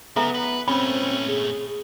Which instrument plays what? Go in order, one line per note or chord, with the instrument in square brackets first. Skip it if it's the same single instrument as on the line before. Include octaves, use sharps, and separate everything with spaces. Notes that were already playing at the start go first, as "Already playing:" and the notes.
[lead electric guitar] C#3 [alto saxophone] B3 [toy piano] A4 E5 A#5
[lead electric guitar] B4
[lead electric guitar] A#2 A3 [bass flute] C4 [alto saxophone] C#4 [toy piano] B5
[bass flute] G#4